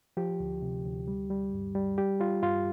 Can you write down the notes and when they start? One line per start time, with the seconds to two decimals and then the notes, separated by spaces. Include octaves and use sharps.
0.17 F3 G4
0.40 D2
0.62 C3
0.85 D2
1.08 G3
1.30 G3
1.53 G2
1.75 G3
1.98 G3 G4
2.20 G3 F4
2.42 G2 F4